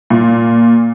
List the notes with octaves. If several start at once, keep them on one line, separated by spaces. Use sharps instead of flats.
A#2